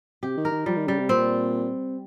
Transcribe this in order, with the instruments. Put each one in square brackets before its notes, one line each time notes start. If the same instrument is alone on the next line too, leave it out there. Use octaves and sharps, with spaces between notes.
[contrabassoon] C3 [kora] G4
[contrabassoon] D#3
[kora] A#4
[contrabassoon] D#3
[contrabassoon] F3 [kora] G3
[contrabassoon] D#3
[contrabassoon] C#3 [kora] G3
[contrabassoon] C3
[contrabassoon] A#2 [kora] C4